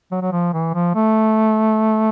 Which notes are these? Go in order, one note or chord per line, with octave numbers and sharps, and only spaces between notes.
F#3
F#3
F3
E3
F3
A3